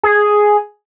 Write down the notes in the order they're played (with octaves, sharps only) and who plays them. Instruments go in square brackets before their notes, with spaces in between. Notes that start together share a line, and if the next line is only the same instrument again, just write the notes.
[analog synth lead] G#4